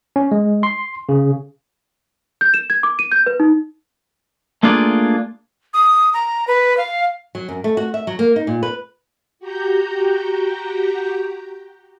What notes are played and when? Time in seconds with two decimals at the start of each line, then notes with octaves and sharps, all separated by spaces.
0.16 C#4
0.32 G#3
0.63 C6
1.09 C#3
2.41 G6
2.54 E7
2.70 G#6
2.83 D6
2.99 D#7
3.12 G6
3.26 B4
3.40 D#4
4.63 A3 A#3 D4 F4 G#4 D5
5.74 D#6
6.14 A#5
6.48 B4
6.77 F5
7.35 F#3
7.49 F#2
7.64 A3
7.77 F#4
7.94 E5
8.07 F#3
8.19 A#3
8.36 D#4
8.47 A#2
8.63 B4
9.39 F#4 G4 A#5 G6